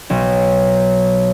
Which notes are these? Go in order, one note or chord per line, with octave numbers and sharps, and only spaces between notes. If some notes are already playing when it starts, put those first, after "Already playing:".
B1